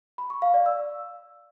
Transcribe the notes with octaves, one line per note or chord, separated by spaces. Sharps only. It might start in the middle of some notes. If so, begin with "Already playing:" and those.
B5
C#6
F5
D5
E6